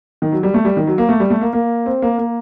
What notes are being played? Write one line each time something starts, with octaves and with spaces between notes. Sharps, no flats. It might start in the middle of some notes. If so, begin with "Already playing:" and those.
D#3
F#3
G3
A3
G3
D#3
F#3
A#3
A3
G3
A3
A#3
A#3
C4
A#3
A#3